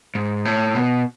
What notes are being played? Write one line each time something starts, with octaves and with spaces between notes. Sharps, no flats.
G#2
A2
B2